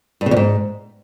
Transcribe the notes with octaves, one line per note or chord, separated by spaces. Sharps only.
G2
C#3
F2
G#2